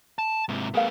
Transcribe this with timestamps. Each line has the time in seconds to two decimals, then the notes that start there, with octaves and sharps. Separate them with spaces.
0.19 A5
0.49 G#2 C3 E4 F4
0.74 A3 B3 G#4 A#4 F5